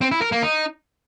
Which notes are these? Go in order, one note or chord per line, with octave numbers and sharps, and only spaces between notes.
C4
E4
A#4
A#3
D#4